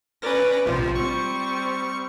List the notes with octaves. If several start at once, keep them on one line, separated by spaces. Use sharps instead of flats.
C#4 B4 D5 A#6
A#1 C3 F3
G3 C4 C#6